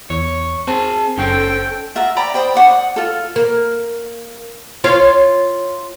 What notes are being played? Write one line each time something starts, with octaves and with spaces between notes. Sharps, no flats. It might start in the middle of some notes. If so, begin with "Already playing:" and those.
E2 C#5
C4 G#4 G#5 A5
F#1 C#4 A4 C5 G5
F4 E5 F#5 A#5
D5 G5 A#5 B5
C5 G5 B5 D#6
C5 D5 F#5 C#6
F#5 D#6
F4 A4
A#3
F4 C#5 F5